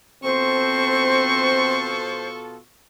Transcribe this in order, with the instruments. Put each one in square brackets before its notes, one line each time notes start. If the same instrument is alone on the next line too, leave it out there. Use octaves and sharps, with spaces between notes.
[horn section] B2 F4 A4 [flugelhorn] C4 [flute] C5 [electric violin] C#6